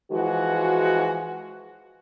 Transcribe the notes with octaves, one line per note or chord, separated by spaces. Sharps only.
E3 F3 G#3 F#4